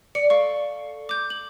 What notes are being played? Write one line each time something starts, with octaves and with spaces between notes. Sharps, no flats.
D5 C#7
A4 F5 C#6
D6 G6
F#7